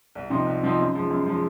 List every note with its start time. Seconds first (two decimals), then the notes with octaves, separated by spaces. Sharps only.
0.15 C2
0.30 C3 F3 C4 D#4
0.46 C2
0.63 C3 F3 C4 D#4
0.79 F#2
0.95 F3 G#3
1.11 F#2
1.26 F3 G#3